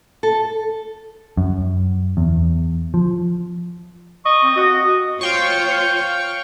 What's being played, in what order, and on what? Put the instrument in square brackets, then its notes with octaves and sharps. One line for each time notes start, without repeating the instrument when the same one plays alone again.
[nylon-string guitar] A4
[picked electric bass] F#2
E2
F3
[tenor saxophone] D#5 [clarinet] C#6
[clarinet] C4
[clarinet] F#4 [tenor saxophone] D#5
[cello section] F4 C5 C#5 [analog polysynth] F5 G5 C#6